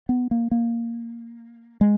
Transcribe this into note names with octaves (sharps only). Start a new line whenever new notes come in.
B3
A#3
A#3
G#3